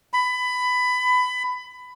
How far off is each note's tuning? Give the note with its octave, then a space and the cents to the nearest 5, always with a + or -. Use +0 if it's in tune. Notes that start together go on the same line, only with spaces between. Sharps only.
B5 +20